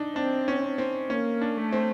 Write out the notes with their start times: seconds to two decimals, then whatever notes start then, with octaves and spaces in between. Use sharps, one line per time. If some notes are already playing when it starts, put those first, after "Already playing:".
Already playing: D4 D#4
0.16 C4 D4
0.48 C#4
0.78 C4
1.10 A#3 C#4
1.41 D4
1.57 A3
1.72 C4